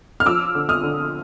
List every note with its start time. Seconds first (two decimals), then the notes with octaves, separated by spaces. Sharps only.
0.20 F6
0.26 F3 D6 E6
0.55 D3
0.69 D#6 F6
0.83 D3